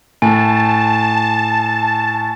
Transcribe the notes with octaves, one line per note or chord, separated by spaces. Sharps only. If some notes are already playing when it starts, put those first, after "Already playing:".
A2 G#5 A5